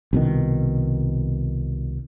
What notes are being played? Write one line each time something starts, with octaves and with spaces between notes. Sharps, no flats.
C2 B2 D#3